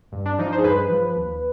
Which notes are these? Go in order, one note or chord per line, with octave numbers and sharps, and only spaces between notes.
G2
D4
F3 D#4
C5
G#4
G2 B4
F3
D#2